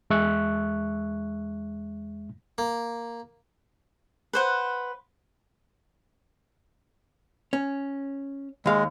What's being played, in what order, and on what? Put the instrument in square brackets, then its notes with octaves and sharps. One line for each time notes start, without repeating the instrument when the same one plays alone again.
[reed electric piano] E2 G#3 E5 C#6 F#6
[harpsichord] A#3
[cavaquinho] B4 C5 F#5
[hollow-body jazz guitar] C#4
[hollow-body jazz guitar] D#2 F5 [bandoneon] G#3